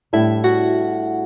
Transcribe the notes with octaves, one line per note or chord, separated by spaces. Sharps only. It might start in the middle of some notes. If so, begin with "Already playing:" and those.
A2 G3 D4 E4 A4 E5
F#4 F#5